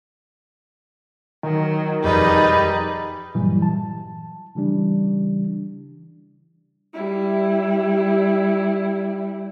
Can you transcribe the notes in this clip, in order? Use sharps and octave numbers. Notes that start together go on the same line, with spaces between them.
D#3 F#3
E1 F2 G3 D#4 G#4 B4 D#5 B5
G2 A#2 E3 F#3 G3
A5
C#3 E3 G3 D4
G3 E4